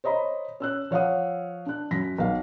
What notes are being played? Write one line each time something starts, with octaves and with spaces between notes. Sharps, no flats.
C5 C#5 D#5 A#5 B5
C#4 E6 F#6
F3 C#5 F5 F#5 D#6
D4 F#6
F#2 A#6 B6
B1 F5